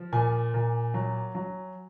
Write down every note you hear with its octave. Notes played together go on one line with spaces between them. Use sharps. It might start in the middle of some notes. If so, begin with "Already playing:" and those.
Already playing: F3
A#2 G#5
A#2
F#3
F#3